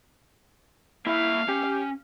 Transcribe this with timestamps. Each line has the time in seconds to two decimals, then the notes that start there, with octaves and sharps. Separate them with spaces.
1.07 A#3 E4 E5 F5
1.49 C#4 G4